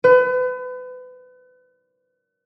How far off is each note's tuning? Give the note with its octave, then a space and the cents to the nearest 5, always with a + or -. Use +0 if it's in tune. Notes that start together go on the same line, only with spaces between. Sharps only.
B4 +35